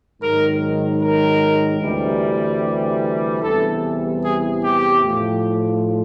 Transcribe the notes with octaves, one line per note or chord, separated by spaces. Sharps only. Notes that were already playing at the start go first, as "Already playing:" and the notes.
G#2 D#3 F#3 A#4
A#4
D2 C3 E3 G3
E2 C3 E3 G3 A4
G#4
G4
A2 F3